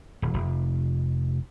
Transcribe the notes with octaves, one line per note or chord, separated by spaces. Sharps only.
D#1
F1